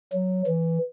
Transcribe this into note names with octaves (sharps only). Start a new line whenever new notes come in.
F#3
E3